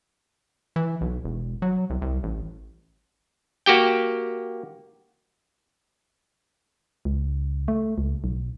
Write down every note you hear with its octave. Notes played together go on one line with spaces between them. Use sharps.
E3
B1
E1
F#3
C2
C2
A1
A#3 F#4 G4 G5
C#2
A3
C#2
B1